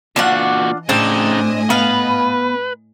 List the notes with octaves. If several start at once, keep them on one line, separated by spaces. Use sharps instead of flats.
A#2 E3 D4 F4 F#4 F#5
A2 C#3 C4 D4 D#4 D#5 G#5
B3 B4 F5